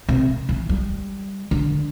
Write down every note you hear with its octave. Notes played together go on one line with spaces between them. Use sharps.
C3
E3
G3
D3